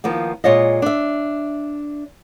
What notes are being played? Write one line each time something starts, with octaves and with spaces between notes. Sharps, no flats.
D#3 F3 A#3 B3
A#2 G#3 F4 C#5 D#5
D4 E5